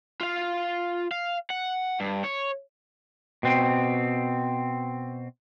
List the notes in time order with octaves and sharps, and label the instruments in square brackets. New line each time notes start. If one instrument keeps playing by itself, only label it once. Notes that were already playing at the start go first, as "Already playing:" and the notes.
[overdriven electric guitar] F4 F5
F5
F#5
G2
C#5
[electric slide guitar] B2 C4